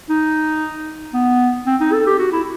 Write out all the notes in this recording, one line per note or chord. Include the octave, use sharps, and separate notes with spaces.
D#4
B3
C4
D#4
A4
G4
F#4
E4